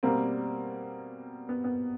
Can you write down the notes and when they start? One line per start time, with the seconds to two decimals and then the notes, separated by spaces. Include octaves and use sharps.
0.03 B2 G3 A#3 C4
1.49 B3
1.64 B3